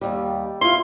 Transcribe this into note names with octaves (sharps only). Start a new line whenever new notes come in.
D#2 G3
E4 F4 C6